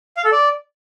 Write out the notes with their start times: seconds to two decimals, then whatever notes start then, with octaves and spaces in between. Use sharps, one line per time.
0.17 F5
0.25 A4
0.32 D5